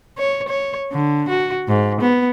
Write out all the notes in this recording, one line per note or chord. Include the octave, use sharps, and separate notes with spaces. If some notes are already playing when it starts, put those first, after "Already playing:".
C#5
C#5
D3
F#4
G#2
B3